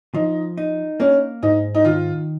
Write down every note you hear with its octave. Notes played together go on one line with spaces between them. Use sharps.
F3 D#4
D#4
A#3 C#4
G#2 D#4
D#4
D#3 F4